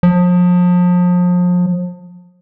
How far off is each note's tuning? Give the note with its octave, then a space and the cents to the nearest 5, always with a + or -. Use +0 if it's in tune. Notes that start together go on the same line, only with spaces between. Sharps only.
F3 +35